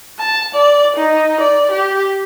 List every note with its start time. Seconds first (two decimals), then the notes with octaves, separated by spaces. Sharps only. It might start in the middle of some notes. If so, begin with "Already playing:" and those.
0.20 A5
0.54 D5
0.96 D#4
1.41 D5
1.71 G4